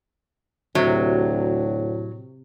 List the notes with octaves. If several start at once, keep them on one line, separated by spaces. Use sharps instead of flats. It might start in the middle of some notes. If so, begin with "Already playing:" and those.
D2 A2 C3 F#3